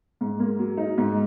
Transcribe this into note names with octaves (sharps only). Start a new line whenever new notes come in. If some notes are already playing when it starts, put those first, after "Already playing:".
G#2
A#3
F#3
D#4
G#2